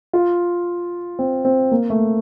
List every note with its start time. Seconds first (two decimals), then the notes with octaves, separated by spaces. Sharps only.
0.13 F4
1.19 C4
1.45 C4
1.71 A#3
1.90 A3